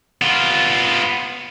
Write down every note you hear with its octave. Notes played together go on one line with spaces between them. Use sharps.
B3 F4